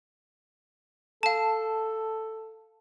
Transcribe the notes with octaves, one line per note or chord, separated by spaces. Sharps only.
A4 F5 A5